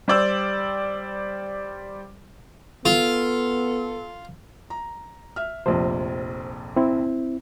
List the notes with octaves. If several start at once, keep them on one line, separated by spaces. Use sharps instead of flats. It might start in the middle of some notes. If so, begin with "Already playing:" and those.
G3 C5 D5 E6
B3 F4 A4
A#5
E5 F6
F1 A#1 F2 C5
C4 E4